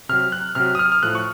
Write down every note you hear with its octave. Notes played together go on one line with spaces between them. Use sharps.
C3 F#3 F6
F#6
C3 F#3 F6
D#6
F6
F6
A2 F3 F#6
C#6